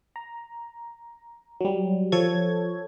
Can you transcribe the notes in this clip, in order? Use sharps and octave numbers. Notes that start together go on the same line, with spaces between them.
A#5
F#3 G3
F3 A4 C#5 G#6